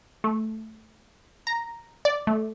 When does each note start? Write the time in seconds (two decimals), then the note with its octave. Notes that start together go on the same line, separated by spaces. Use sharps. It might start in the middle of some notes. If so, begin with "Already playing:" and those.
0.24 A3
1.47 A#5
2.05 D5
2.27 A3